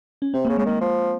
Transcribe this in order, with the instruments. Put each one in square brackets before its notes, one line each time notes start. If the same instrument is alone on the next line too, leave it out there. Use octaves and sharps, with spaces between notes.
[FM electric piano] C#4
[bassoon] C3 [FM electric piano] C4
[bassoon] C#3 [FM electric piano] A#3
[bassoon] C#3 [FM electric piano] G#3
[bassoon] D#3 [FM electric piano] A#3
[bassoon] F3